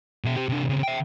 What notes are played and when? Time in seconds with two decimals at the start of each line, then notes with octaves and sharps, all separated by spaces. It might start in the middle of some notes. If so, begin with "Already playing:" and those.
0.24 B2 E5
0.36 G4 C5
0.49 C3 D4
0.69 C#3 C4
0.83 E5 G5